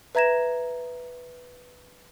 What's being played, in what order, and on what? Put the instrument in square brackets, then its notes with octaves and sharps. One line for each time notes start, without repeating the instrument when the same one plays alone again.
[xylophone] B4 E5 A#5 G#6 A#6 E7